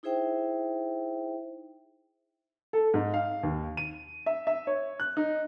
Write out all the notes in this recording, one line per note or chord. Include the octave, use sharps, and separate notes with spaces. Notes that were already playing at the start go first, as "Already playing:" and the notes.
D#4 E4 G#4 C5 E5 G5
A4
G#2
F5
D#2
D#7
E5
E5
C#5
F#6
D#4